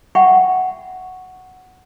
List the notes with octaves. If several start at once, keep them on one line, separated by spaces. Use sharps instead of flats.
E5 F#5 G5 B5 C#6